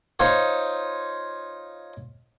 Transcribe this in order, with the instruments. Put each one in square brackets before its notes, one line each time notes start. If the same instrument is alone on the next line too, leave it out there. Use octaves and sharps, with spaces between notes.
[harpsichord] D#4 F4 C5 C#5